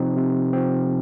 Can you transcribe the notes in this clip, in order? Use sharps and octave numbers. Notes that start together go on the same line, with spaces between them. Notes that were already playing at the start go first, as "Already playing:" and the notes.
Already playing: C3 F3 C4 D#4
C3
F3 C4